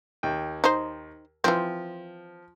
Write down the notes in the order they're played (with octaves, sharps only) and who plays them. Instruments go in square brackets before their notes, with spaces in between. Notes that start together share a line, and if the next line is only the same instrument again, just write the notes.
[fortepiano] D#2 G5
[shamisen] D#4 C5
[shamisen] E3 C4 [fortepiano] F3